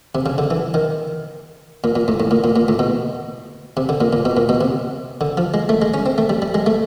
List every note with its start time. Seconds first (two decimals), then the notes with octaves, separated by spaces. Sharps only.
0.15 C3
0.26 C#3
0.38 D3
0.51 E3
0.74 D#3
1.84 A#2
1.95 A#2
2.08 A2
2.20 A2
2.31 A#2
2.44 A#2
2.56 A#2
2.68 A2
2.79 B2
3.77 C3
3.89 D3
4.01 A#2
4.13 A#2
4.25 B2
4.37 A#2
4.49 B2
4.61 C3
5.21 D3
5.37 F3
5.54 G#3
5.69 A3
5.82 G#3
5.94 C#4
6.06 C4
6.18 A3
6.30 G3
6.42 G3
6.54 G#3
6.66 A3